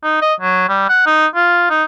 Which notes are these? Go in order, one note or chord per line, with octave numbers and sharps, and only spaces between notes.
D#4
D#5
F#3
G3
F#5
D#4
F4
D#4